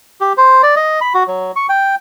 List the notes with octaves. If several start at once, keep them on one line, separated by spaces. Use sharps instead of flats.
G4
C5
D5
D#5
B5
F#4
F#3
C#6
G5